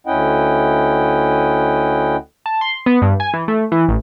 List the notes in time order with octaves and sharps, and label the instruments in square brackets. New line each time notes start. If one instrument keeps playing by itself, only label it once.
[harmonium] D2 C#4 E4 D#5 F#5 G5
[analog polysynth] A5
C6
B3
G2
G#5
E3
A3
E3
A1